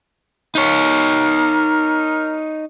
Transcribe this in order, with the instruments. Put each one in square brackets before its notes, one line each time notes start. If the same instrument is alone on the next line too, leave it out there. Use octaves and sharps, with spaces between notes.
[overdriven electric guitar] D#4 C#5 [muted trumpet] A#4